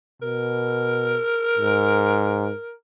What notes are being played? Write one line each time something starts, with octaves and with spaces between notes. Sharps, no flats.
B2 A#4
G#2